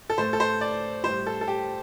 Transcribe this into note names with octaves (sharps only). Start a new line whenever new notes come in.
A4
A2 A3 C5
A4
C5
D5
A2 G3 C5
A4
A4
G4